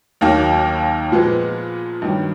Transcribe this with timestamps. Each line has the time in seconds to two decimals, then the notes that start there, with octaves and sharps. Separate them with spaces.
0.21 D#2 D#3 F#3 A#3
1.12 A#2 F3 G#3 B3
2.02 G2 D#3 F#3